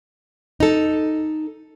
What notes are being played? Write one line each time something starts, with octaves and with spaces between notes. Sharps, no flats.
D#4 A4